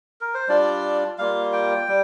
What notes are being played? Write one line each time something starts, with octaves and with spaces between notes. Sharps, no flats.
A#4
C5
G3 D4 F4 D5
G3 A#3 F4 F5
G5
G3